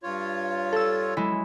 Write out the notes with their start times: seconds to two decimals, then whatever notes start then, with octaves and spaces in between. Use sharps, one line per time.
0.03 G2 F4 C#5
0.73 A4 E6
1.17 F#3 G#3 E4